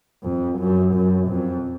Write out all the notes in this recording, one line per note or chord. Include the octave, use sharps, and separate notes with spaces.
F2
F#2
F#2
F2